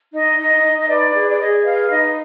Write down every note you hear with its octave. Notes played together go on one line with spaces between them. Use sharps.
D#4 D#5
D#4 D#5
D#4
D#5
B4 D5
G#4
D5
G#4 D#5
D#5
B4 F5
D#4 D#5